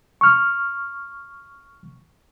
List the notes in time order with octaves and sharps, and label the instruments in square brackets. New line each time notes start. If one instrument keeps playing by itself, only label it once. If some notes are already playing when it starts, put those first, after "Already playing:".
[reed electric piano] C#6 F6